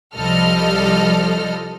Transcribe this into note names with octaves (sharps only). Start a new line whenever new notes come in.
C2 F3 G3 A4 D#5 F6